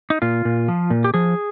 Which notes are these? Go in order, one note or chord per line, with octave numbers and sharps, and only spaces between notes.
D#4
A#2 F4
A#2
F3
A#2
G4
F3 G#4